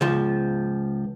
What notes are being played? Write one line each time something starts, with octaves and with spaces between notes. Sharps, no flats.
C#2 F3